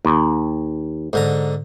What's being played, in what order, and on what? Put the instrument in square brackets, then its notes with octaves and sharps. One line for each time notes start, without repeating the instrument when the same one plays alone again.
[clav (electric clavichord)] D#2
[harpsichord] G#2 D3 A#5